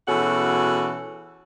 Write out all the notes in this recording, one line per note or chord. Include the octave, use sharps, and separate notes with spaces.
B2 E3 C#4 F#4 G#4 A4